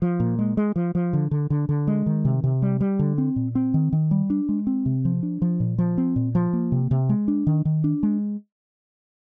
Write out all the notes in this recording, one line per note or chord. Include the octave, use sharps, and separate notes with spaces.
F3
A#2
G#3
G#3
F3
F3
D3
D3
D3
D3
G#3
D#3
C3
C3
G3
G3
D3
C4
A#2
C4
D#3
D#3
G3
D4
G#3
C4
C3
F3
D4
F3
A#2
F3
C4
A#2
F3
A#3
C3
C3
G#3
D4
D#3
D#3
D4
G#3